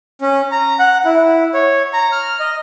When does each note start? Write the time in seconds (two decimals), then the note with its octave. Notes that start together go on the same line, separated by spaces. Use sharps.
0.21 C#4
0.52 A#5
0.79 F#5
1.05 E4
1.54 C#5
1.93 A#5
2.12 F6
2.40 D#5